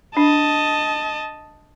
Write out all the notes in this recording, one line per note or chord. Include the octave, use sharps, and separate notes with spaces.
D4 D#5 A5